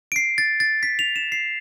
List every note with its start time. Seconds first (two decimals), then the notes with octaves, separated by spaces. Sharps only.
0.12 D7
0.16 C7
0.38 A6
0.60 A6
0.83 B6
0.99 F7
1.16 E7
1.32 C7